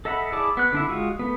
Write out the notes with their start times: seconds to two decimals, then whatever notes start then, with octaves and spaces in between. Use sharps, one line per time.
0.05 A4 D#5 E5 F#5 B5
0.32 E4 G#4 D5 A5 D6
0.57 B3 F#6
0.72 D3 D4 E4
0.89 G#3 F4 F#4
1.19 A3 B3